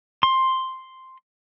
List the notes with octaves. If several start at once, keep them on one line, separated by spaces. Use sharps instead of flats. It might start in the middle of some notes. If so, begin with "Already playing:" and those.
C6